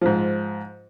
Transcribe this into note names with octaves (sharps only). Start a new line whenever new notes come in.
G#2 F3